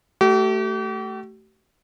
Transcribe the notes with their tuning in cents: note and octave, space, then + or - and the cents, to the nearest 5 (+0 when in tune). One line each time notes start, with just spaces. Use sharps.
A3 +0 G4 -45